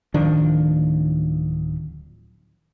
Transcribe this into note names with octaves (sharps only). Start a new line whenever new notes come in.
D1 D#3 F3 D4